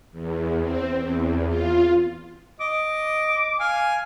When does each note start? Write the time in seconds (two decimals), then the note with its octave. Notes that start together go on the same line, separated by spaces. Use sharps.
0.12 E2
0.61 C4
0.96 E2
1.48 F4
2.61 D#5 D6
3.60 F5 G#5